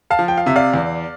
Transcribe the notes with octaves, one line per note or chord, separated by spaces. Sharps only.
F5 A5
F3
G5
F5
C3 E5
D5 F5
E2